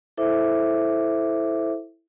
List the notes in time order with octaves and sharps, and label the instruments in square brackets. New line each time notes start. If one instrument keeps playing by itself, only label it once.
[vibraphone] E4 A4 C5 E5 D6